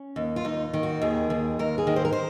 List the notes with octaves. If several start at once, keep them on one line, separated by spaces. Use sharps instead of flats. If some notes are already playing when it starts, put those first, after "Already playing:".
Already playing: C#4
D#2
F4
D#2 D#4
D#3
F#4
D#2 G#4
D#2
D#2 A#4
G#4
D#3
C5
A#4
C5